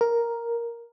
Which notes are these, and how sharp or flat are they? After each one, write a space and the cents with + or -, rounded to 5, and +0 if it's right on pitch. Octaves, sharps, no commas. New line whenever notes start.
A#4 +5